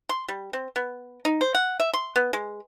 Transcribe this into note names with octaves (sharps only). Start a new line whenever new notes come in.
C6
G3
C4
B3
D#4
C5
F#5
E5
C6
B3
G#3